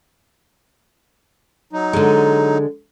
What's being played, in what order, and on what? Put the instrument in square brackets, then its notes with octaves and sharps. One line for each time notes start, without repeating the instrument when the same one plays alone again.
[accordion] F#3 D#4
[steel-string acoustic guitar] D3 G#3